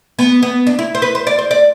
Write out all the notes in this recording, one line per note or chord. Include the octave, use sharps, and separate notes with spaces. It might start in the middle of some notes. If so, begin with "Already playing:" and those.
B3
B3
D4
E4
C5
B4
C5
D5
C5
D5